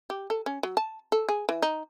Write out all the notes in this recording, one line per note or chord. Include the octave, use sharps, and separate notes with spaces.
G4
A4
C#4
F#3
A5
A4
G#4
E3
D#4